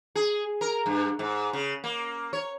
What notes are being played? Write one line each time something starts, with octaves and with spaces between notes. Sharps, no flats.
G#4
A#4
G2
G#2
C#3
A#3
C#5